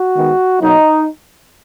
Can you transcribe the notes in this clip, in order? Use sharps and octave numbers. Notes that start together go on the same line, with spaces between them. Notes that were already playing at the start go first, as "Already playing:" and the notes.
Already playing: F#4
D#3 G#3 B3
B2 F#3 A#3 D#4